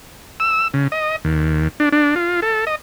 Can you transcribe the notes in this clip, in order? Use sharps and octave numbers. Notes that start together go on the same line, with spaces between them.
E6
C#3
D#5
D#2
D4
D4
F4
A4
D#5